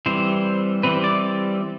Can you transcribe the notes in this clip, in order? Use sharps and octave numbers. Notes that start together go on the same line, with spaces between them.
E3 G3 C4 C5
E3 G3 C4 B4
D5